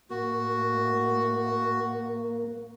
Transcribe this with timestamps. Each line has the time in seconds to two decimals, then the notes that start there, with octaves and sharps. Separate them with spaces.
0.10 A2 A#3 F#4